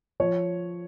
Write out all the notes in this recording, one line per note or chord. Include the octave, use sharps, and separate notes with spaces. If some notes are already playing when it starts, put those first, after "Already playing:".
F3 C#5